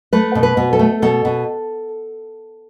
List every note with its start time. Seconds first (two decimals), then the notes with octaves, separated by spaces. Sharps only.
0.13 A3 B4
0.35 B2
0.43 B4
0.57 B2
0.73 A4
0.79 A3
1.02 B2 A4
1.25 B2